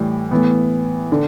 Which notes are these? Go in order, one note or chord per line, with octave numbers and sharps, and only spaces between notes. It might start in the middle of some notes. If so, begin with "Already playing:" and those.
Already playing: A2 E3 G3
A2 E3 B3
D3